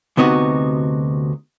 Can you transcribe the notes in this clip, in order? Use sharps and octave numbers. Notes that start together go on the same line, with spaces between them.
D2 C3 B3 D#4 F#4